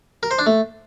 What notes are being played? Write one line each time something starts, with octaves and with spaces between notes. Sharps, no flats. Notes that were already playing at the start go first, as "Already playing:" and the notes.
A#4
C5
D4
A3